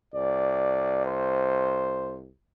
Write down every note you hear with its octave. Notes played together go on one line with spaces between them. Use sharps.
C2 D5
C5